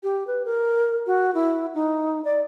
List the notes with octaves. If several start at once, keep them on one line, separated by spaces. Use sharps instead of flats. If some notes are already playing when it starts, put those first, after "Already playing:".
G4
B4
A#4
F#4
E4
D#4
D5